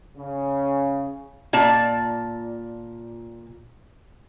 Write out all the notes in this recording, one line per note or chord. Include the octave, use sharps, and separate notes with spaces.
C#3
A#2 D5 A5